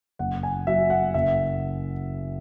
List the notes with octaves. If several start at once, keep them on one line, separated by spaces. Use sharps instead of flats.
F#1 F#5
G#5
F#3 E5
F#5
F#1 E5